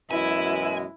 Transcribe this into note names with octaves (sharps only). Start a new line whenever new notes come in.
F#2 B2 E3 G#3 E4 G#5